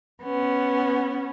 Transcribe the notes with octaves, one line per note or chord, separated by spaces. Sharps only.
B3 C#4